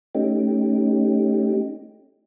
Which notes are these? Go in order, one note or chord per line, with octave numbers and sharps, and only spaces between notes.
A3 C#4 D#4 G4